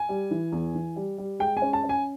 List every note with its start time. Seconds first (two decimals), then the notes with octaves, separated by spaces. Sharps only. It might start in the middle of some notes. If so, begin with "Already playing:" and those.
Already playing: G#5
0.09 G3
0.31 E3
0.52 E2
0.74 E3
0.96 G3
1.18 G3
1.39 G#3 G5
1.57 G#5
1.62 C#4
1.73 A5
1.84 C#4
1.89 G#5